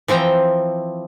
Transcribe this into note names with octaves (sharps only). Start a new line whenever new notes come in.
E3 F3 C4 G5 A#5